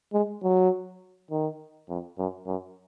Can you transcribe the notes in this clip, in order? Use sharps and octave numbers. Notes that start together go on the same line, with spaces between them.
G#3
F#3
D#3
F2
F#2
F#2